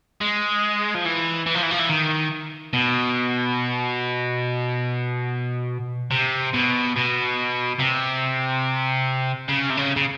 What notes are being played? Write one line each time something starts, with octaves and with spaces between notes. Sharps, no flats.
G#3
F3
E3
E3
F3
E3
F3
E3
D#3
B2
C3
B2
B2
C3
C#3
C3
C#3
C#3